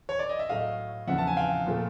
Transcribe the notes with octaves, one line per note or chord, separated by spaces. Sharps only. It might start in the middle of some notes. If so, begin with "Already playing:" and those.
C#5
D5
D#5
E5
A2 F#3 A3 D#5 F5
E2 C#3 F3 E5 F#5
A5
G#5
F5 G5
A#2 F3 A3